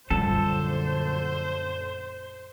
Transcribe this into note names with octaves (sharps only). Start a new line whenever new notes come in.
A#1 F#2 D3 G3 F4 A4 C5